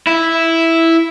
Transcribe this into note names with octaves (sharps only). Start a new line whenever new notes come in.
E4